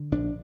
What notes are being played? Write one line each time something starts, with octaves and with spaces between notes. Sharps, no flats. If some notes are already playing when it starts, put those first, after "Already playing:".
Already playing: D3
A#1 D4